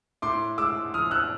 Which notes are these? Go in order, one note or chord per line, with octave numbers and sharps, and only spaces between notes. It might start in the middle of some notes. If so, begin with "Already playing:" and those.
A2 C6 D6
G#3 D6 E6
F3 D#6 F6
E6 F#6